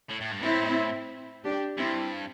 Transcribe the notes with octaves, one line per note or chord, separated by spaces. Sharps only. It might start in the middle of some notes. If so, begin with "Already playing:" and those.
A2
A2
G2
A2 C4 E4
D4 G4
G2 C4 E4